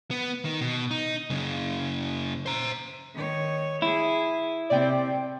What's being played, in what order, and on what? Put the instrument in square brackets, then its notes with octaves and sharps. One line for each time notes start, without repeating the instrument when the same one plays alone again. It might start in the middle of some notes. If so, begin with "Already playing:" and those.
[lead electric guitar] B3
D#3
B2
D#4
F#2 C#3
C5 A#5
[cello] D#3 C#5
[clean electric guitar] E4 [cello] G#4
[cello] C3 C4 [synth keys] D5 G5